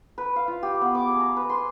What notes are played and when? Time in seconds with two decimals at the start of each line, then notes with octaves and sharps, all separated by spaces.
0.18 B4
0.36 F5
0.48 F4
0.63 G4
0.81 B3
0.95 D6
1.08 G#4
1.20 A#5
1.37 B4
1.49 C6